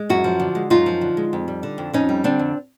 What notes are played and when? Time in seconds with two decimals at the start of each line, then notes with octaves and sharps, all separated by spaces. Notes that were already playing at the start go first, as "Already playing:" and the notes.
Already playing: G#3
0.09 F#2 E4 F#4
0.24 F3
0.40 D3
0.55 G#3
0.70 F#2 D#4 F4
0.86 F3
1.01 D3
1.17 G#3
1.33 F2
1.48 G3
1.63 D3
1.78 F2
1.93 F2 C#4 D#4
2.09 G3
2.24 D3 C4 D4
2.39 F2